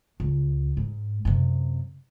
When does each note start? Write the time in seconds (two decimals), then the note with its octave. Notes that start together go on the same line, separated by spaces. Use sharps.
0.20 C#2
0.77 G#2
1.25 F#2 C3